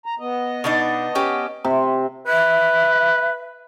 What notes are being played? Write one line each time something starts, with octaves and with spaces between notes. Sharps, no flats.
A#5
B3 D#5
B2 D4 D#4
C#4 G4
C3
B4 E5